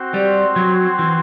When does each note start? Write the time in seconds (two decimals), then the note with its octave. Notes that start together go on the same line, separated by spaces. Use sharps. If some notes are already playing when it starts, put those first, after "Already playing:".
Already playing: C4 F#4 C5
0.14 G3
0.56 F#3
0.99 E3